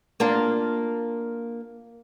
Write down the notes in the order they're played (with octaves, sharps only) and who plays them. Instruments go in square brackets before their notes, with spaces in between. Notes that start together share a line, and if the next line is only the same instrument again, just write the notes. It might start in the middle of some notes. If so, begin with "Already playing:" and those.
[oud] A#3 D4 F4